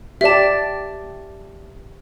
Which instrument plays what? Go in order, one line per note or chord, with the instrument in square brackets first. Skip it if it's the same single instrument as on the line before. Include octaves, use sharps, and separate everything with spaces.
[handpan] G4 D5 [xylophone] E5 A5